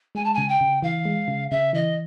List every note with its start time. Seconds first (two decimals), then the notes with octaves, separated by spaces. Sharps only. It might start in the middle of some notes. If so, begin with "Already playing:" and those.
0.15 G#3 G#5
0.24 A5
0.34 C#3 G#5
0.49 G5
0.61 C#3
0.82 E3 F5
1.05 G#3
1.28 C#3
1.51 C#3 E5
1.73 E3 D#5